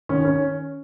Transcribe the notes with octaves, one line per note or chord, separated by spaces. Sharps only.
D#3 C#4
C#4